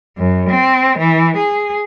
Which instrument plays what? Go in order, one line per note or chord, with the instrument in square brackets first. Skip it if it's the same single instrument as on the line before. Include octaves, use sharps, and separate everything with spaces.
[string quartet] F#2
C4
E3
G#4